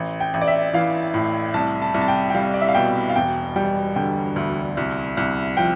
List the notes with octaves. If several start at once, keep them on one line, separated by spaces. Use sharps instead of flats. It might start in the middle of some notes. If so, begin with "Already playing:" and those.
Already playing: A1
G5
A1
D5
E5
E3 F5
A2
C2 A5
A5
C2
A5
G5
G5
G3 F5
D5
E5
F5
B2 G5
F5
E1 G5
G3 G5
D3 G5
D2
C2
C2
F3 G5